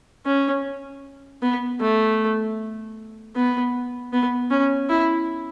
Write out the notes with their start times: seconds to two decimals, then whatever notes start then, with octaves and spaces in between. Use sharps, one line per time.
0.26 C#4
1.42 B3
1.80 A3
3.36 B3
4.13 B3
4.50 C#4
4.89 E4